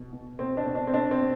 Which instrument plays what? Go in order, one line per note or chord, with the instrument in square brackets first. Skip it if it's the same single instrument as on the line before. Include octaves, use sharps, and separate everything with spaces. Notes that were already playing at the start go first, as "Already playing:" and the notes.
Already playing: [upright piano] B2
B2
B2 C4
D4
B2
D4
C4
B2 D4
C4
B2